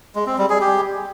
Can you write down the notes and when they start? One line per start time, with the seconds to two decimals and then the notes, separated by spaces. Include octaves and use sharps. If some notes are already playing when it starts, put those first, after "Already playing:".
0.15 G#3
0.27 C4
0.38 G3
0.50 G#4
0.61 G4